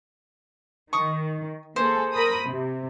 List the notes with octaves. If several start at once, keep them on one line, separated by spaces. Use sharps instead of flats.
D#3 C#6 D#6
A#3 G#4 A4 C5
A#4 B5 D#6
C3